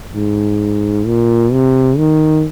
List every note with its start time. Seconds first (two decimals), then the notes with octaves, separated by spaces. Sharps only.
0.15 G#2
1.07 A#2
1.52 C3
1.98 D#3